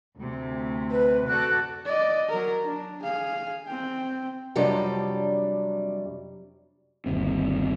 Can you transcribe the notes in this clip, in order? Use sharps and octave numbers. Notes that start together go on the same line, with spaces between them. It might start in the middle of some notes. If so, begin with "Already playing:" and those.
D2 C3
B4
F#4 A4 D5 F#6
D5 D#5
F#3 A#4
D4
G#4 F5
C4 G5
F2 C3 F#3 G3 D4
G1 D#2 C3 C4